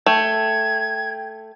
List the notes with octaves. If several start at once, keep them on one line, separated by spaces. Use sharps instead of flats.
A3 G5 G#6